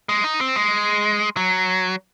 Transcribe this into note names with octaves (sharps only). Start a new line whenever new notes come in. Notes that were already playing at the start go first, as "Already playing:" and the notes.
G#3
D#4
C4
G#3
F#3